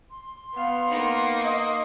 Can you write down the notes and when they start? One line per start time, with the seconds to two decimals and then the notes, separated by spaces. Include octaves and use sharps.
0.11 C6
0.54 B3 F5
0.89 A#3 D#4
1.44 D#5